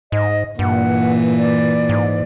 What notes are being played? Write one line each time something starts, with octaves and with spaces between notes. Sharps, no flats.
G#2 D#5
G2 A#2 E3 F#5
D5
G#2